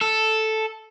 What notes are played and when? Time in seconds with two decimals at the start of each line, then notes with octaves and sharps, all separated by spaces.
0.01 A4